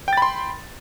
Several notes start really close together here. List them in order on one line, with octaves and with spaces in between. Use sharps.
G5 A6 B5 C6